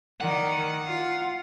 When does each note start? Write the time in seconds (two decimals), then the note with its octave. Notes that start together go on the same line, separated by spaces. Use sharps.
0.21 D#3 D5 F#5
0.87 F4